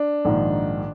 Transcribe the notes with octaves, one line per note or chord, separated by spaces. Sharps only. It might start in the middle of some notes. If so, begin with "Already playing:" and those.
Already playing: D4
A#1 G#2 D#3